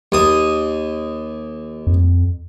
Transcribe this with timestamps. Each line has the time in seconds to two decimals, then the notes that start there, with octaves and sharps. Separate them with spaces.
0.12 D#2 D#6
1.87 F2